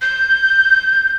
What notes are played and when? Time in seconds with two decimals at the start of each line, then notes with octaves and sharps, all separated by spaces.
0.02 G6